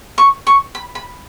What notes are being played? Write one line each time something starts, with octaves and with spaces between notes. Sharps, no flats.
C#6
C#6
B5
B5